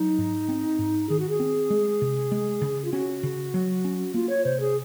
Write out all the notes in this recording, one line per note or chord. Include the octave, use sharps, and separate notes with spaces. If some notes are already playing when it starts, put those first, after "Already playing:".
Already playing: F#3 D#4
G#2
C4
G#2
D#3 G#4
F#4
G#4
C4
G#3
C3
G#3
C#3
F4
C#4 F#4
C#3
F#3
C#4
A#3 F4
C#5
C3 C5
G#4